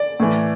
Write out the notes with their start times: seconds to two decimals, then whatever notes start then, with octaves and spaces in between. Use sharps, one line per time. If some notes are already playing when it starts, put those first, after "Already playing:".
Already playing: D5
0.20 A2 E3